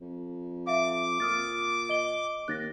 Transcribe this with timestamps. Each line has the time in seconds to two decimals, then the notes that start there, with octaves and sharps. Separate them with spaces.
0.01 F2
0.67 E5 F5 D6
1.20 A#2 D#6 F6 A6
1.89 D#5 G7
2.48 D#2 F#6 A6 A#6